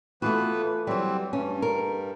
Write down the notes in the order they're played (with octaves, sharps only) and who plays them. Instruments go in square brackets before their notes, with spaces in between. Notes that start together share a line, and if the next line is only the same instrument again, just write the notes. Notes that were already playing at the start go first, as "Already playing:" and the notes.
[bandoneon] E3 B3 B4 [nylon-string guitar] A3 F4 F#4
[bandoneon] E3 C4 [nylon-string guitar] F#3 G3
[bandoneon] G2 [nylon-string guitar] C#4
[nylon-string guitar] A#4